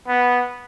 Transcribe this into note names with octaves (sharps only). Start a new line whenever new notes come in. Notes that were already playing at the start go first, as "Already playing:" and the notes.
B3